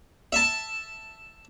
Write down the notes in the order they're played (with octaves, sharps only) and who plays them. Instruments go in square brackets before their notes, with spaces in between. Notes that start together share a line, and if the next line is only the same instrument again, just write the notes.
[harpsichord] E5 A5